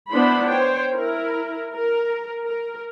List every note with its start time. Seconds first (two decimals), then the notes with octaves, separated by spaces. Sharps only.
0.10 B3 D4 E4 C5 B5
0.49 C5 C#5 G5
0.92 E4 A#4
1.75 A#4
2.43 A#4